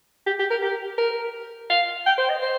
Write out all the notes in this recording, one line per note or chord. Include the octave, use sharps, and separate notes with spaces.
G4
G4
A#4
G4
A#4
F5
G5
C5
D#5
C5